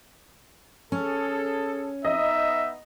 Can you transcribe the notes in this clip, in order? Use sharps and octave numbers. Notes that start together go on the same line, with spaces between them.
C#4 G#4 A4
B3 D#4 D#5 E5